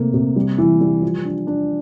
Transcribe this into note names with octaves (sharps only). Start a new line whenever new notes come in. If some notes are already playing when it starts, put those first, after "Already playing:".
Already playing: C3 A3 A#3
C3
G3
E3
G3
F3
D4
D4